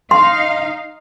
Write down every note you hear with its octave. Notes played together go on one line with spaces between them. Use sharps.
D#4 F5 C6